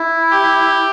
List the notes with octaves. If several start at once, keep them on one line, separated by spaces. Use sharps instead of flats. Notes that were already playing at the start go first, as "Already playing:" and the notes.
Already playing: E4
G4